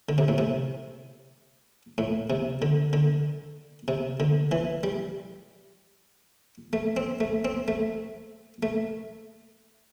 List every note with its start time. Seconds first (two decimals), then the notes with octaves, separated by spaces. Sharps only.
0.09 D3
0.18 C3
0.28 A2
0.38 C3
1.98 A2
2.30 C3
2.62 D3
2.93 D3
3.88 C3
4.20 D3
4.52 E3
4.83 G3
6.73 A3
6.97 C4
7.20 A3
7.45 C4
7.68 A3
8.63 A3